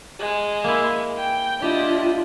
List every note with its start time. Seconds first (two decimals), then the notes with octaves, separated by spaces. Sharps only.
0.19 G#3
0.64 A#3 E4
1.17 G5
1.62 D4 E4 F4 G4 D#5